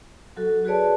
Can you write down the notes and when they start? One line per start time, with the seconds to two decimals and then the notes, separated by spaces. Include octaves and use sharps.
0.37 F#3 F#4 A4
0.65 F#4 G#4 B4 C#5 D5 A5